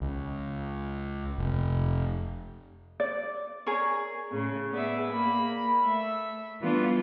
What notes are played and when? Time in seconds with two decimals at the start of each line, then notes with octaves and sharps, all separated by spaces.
0.02 C#2
1.38 F1
3.00 D5
3.66 G#4 A#4 C#5
4.31 A2 C#3
4.70 B3 G#4 D5 E5
5.10 A#3 B5
5.83 A3 E5
6.60 E3 G3 A3 B3 D4 F4